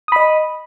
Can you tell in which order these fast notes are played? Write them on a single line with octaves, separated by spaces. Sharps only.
D#6 B5 D#5